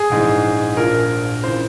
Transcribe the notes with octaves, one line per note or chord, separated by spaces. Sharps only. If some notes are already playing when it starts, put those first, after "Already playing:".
Already playing: G#4
A#1 G#2 E3 G#3
A#1 A#2 F3 A#4
C#3 E3 C5